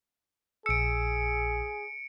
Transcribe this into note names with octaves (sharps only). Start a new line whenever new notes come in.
A#1 G#4 E6 C#7 D7